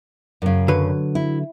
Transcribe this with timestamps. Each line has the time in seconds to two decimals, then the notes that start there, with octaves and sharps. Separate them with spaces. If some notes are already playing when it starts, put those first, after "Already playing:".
0.42 F#2 C#3
0.68 D3 F#3 B4
1.15 E4